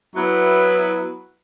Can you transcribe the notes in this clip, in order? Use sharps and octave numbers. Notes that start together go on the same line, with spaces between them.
F#3 B3 E4 B4